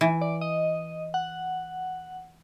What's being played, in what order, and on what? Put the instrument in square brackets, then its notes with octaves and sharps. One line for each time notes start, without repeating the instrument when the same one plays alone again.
[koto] E3
[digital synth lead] D5
D#5
F#5